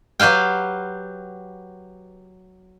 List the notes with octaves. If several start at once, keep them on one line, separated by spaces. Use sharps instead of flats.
F#3 G4 B4 F5 G5